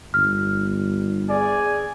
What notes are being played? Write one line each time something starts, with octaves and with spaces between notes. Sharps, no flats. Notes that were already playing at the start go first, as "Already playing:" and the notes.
G1 F6
G#4 D5 G#5